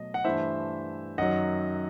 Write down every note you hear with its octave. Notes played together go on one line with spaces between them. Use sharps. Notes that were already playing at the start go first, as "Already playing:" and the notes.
Already playing: B2 F#3 A3 D#5
F#5
G2 E3 A3 E4 C5 E5
F#2 D#3 F#3 D#5 F#5